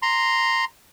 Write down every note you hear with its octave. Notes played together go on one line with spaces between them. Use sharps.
A#5 C6